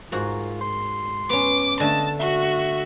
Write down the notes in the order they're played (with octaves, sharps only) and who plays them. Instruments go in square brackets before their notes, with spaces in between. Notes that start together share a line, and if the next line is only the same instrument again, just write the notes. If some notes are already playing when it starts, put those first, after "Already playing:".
[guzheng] G#2 F#4 A#4 [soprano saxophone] F4
[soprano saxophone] C6
[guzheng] B3 C#4 [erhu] D6
[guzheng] D3 A3 [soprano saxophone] D#5 [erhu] A5
[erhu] F#4 [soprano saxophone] E5